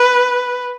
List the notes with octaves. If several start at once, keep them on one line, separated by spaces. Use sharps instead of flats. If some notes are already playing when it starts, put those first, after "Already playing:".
Already playing: B4